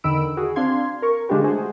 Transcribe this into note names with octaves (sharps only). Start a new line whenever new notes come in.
E2 D3 D#3 B5 E6 D7
F#4 G#4
C4 D4 F5 C6 G#6
A#4 C#6
D3 G#3 D4 F4 G4 B4
G#3 A3 F#4 G#4 C5